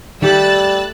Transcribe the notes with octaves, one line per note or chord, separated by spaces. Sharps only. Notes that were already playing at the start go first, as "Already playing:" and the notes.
D#3 G3 A3 G4 E6 F#6 A6